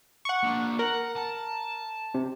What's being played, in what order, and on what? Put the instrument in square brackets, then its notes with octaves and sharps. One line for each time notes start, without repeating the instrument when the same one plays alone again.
[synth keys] F#5 C#6
[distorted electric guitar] A#3 D4
[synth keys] A#4 [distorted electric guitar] F#5
[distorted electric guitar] A5
[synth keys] C3